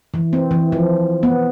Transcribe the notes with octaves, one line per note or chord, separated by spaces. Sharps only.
E3
C4
E3
F3
B3